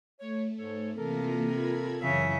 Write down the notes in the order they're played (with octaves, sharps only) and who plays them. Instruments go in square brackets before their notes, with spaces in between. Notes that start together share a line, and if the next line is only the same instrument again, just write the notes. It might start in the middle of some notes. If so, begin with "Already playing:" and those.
[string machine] A3 [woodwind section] C#5
[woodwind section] G#2 A4 C#5
[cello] C3 [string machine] E3 A#3 F4 [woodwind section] A4 A#4
[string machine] F4 B5 G#6
[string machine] F#2 E3 [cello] C#3 E5 [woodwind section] A#4 C#5 F5